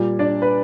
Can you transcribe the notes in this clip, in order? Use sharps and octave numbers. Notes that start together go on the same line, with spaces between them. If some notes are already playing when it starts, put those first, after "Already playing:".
Already playing: A#2 G3
D4 D5
B4